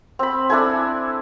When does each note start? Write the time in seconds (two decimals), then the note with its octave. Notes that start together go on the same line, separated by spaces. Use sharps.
0.19 C4 B5
0.50 D4 E4 A4 G#5